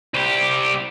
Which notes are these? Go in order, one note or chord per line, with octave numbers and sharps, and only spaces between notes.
C2 G4